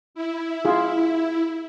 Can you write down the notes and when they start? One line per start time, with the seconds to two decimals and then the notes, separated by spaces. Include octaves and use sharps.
0.15 E4
0.65 F4 G#4